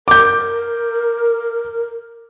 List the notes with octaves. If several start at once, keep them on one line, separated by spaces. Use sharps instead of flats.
A#4 D6 G6